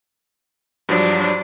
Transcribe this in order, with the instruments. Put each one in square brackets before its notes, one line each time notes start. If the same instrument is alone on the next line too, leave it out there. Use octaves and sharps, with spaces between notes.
[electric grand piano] G2 F3 F#3 [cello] D4